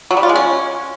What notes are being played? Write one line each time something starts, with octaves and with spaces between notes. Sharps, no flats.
F#3
G3
F4
G#3
C#4